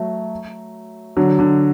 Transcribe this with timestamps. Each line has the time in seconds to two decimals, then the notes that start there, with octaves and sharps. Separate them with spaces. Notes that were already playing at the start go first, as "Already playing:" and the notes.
Already playing: F#3 A3
1.17 D3 F#3
1.39 D3